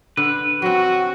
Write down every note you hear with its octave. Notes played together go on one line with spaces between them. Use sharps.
D3 B4
F#3 C4 F#4